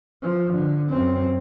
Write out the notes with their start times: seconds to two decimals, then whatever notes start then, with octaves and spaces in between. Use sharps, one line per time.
0.22 F3
0.54 D3
0.89 F#2 C4